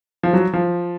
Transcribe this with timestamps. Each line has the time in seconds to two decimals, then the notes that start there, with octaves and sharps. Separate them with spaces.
0.23 F3
0.33 F#3
0.53 F3